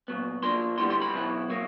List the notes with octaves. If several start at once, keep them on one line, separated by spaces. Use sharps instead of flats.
A#2 F#3 B3
A#2 F3 A#3 D4 C6
D2 D3 G3 B3 E4 C6
C6
B5
B2 F#3 B3 E4
B2 F#3 A#3